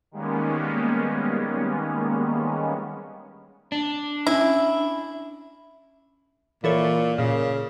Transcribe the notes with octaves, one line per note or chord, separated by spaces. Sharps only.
D#3 G3 G#3 A#3 B3 C#4
D4
C#4 E4
A#2 E3 A4 C#5
A#2 C#3